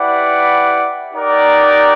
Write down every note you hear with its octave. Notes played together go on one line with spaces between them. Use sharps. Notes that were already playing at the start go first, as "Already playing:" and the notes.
Already playing: E4 G4 B4 D5 F#5
D#4 G4 A#4 D5 F#5